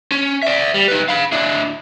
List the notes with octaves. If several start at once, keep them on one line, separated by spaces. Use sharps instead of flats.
C#4
D5 E5
G3
D#4 B4
F5 B5
D4 E4